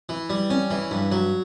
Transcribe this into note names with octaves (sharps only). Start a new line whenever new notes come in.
E3
G3
C#4
E3
G2
F#3